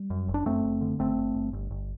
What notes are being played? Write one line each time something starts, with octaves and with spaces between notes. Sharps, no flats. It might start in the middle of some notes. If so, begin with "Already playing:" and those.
Already playing: G3
F#2
F#1
D4
F#2 A3 C4
F#1
D3
G1 A3 C4
G1
G1
G1
G1